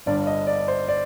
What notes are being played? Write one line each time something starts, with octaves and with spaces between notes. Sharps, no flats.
G1 G2 D3 D5
D#5
D5
C5
D5